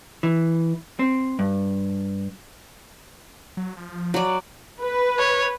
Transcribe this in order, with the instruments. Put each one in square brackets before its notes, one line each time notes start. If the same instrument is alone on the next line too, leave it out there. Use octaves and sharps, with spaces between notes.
[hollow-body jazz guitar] E3
C4
G2
[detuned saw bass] F#3
F3
[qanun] F#3 D5
[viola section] B4
[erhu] C#5